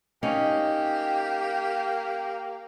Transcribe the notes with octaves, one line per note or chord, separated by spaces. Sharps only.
A#3 C#4 D#4 G4